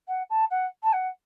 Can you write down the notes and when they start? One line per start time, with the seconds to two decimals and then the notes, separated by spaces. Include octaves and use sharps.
0.08 F#5
0.30 A5
0.51 F#5
0.83 A5
0.93 F#5